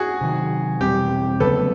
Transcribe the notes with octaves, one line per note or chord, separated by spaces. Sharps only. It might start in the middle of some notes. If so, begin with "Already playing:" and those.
Already playing: F#4 G#4
C3 D#3 F#3
E2 B2 G3 C4 G4
D2 C#3 F#3 B3 A4 B4